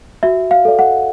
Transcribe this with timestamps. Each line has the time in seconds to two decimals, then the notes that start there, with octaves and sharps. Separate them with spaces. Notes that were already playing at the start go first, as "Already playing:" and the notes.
0.23 F#4 E5
0.51 F5
0.65 A4 D5
0.79 F#5